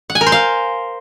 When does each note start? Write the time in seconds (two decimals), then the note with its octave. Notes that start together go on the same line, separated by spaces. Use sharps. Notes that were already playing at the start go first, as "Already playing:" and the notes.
0.10 F#5
0.15 G#5
0.21 A#4
0.27 C5
0.32 F5